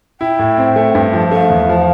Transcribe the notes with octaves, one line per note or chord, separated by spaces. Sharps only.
E4 G5
A2
C4
A3
G2
F3
A3 F5
E2
F3